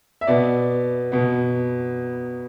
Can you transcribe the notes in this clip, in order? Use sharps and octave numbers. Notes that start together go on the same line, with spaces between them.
E5
B2 B3 D5
B2 B3